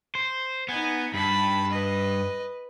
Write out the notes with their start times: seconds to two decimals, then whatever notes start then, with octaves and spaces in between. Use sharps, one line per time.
0.15 C5
0.68 B3 D#4 G#5
1.14 G2 A5 B5
1.71 B4 D#5